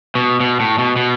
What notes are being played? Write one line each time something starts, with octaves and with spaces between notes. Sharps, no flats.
B2
B2
A2
B2
B2